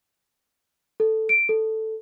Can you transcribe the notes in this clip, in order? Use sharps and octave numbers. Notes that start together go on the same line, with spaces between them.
A4
D7
A4